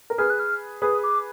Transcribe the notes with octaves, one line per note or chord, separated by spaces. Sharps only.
A#4
G#4 B4 F6
F#6
F6
G#4 B4 D#6
D6